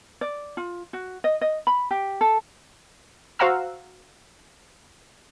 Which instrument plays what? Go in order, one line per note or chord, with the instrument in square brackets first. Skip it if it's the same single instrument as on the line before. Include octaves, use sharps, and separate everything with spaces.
[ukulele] D5
F4
F#4
D#5
D#5
B5
G4
A4
[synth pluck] F#4 C5 F5 F#5 A#5 E6